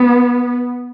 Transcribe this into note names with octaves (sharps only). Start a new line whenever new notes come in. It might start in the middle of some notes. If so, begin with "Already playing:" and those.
Already playing: B3